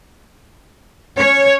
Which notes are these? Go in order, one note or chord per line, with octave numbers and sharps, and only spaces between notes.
C#4 C#5